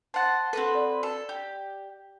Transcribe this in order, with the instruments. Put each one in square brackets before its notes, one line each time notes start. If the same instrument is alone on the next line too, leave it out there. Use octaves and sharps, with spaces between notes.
[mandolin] C5 F#5 [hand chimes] A5 A6
[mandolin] C4 F#4 B4 [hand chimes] A4
[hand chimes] D5
[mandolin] A4
G4